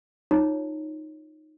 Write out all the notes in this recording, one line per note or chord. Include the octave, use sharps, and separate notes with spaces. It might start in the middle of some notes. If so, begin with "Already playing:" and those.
D#4 F4 C#5 A#5